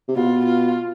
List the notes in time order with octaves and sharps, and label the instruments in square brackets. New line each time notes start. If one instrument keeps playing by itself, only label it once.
[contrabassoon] C3
[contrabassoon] B2 [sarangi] F4
[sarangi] F4